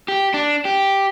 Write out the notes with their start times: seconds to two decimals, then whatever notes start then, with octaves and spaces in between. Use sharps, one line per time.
0.08 G4
0.34 D4
0.65 G4